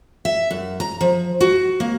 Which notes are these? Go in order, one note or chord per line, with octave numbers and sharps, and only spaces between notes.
E5
F#2
A#5
F3
F#4
A#3